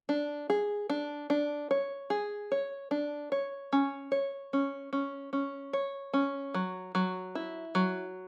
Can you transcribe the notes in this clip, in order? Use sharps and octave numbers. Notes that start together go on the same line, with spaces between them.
D4
G#4
D4
D4
C#5
G#4
C#5
D4
C#5
C#4
C#5
C#4
C#4
C#4
C#5
C#4
F#3
F#3
E4
F#3